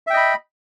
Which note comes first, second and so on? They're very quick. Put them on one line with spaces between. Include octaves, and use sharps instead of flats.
E5 G5 D#5 B5